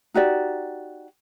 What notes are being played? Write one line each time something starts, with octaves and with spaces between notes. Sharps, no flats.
D#4 F#4 G4 D5